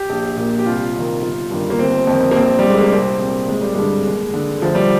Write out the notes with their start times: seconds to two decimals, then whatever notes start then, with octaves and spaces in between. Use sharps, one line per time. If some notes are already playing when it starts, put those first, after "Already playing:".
Already playing: G4
0.09 A#1
0.37 A#2
0.59 G4
0.66 C2 F4
0.95 C3 D#3
1.22 G1 F4
1.51 G2 D#3
1.70 A#3
1.79 G1 C4
2.07 F2 D#3
2.31 A#3
2.36 A#1 C4
2.59 G3
2.64 A#2
2.70 G#3
2.81 A#3
2.92 C2 C4
3.20 A#2 C4
3.48 G#1 G#3
3.61 G3
3.74 G2 D3 G#3
4.05 D#2
4.34 D3
4.62 D2 F3
4.75 G3